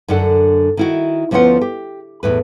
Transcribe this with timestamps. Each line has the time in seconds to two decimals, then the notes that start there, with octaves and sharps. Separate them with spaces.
0.08 F#2 D3 D4 A4 F#5
0.77 D#3 E4 F#4
1.31 D2 F3 B3 C#4 F4 F#5
1.61 G4
2.23 E2 A2 B4